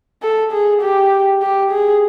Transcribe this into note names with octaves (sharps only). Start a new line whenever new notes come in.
A4
G#4
G4
G4
G#4